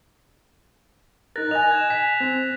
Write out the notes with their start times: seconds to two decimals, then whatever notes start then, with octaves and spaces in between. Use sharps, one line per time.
1.36 D#4 A#4 F#6 A6 A#6
1.51 D#5 G#5 F#6 A#6 F7
1.71 G#6 E7
1.90 G#5 B6
2.20 C4